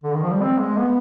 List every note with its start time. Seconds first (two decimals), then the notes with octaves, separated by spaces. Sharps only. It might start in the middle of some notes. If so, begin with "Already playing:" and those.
0.03 D3
0.14 D#3
0.22 F3
0.32 G3
0.41 C4
0.58 G#3
0.78 B3